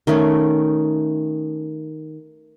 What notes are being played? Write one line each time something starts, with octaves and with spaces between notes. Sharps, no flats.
D#3 A3 C#4